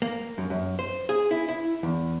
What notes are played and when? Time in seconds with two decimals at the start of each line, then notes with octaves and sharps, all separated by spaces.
0.02 A#3
0.38 F#2
0.50 F#2
0.79 C5
1.09 G#4
1.31 E4
1.48 E4
1.83 E2